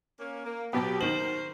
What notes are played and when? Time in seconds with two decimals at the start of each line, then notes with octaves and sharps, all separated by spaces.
0.19 A#3 C#4
0.45 A#3
0.73 B2 F#3 B3 G4
1.01 D#3 A#4 C5 F#7